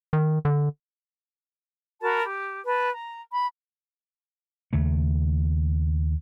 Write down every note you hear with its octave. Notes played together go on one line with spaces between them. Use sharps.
D#3
D3
F#4 A#4 A5 B5
G4
B4 A5
A#5
B5
D#2 C#3 A3